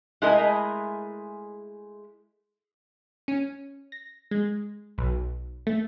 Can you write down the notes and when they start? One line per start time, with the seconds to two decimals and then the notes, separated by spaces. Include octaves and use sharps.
0.22 G#3 A3 E4 G#4 A#4 D#5
3.28 C#4
3.92 A#6
4.31 G#3
4.98 B1
5.67 A3